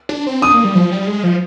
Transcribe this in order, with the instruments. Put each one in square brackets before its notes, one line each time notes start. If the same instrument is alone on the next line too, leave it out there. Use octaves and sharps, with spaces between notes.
[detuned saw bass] D4
C4
[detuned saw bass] D4 [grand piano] D#6
[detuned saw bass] A#3
G3
F3
G3
G#3
F3